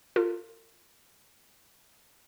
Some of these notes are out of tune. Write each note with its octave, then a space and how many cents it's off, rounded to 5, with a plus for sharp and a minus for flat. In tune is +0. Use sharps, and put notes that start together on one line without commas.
F4 +0 A#4 -45